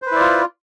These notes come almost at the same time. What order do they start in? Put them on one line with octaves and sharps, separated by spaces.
C5 B4 E4 D5 F4